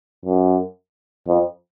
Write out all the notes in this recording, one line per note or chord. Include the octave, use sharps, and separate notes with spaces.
F#2
F2